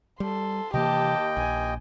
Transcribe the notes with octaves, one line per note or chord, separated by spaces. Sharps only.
G3 A4 C6
D#2 C3 E3 A#3 G4 D#5 G5 A5
A#1 G#5